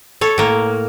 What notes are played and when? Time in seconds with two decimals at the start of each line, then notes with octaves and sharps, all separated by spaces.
0.21 A4 C#5
0.38 A2 A#3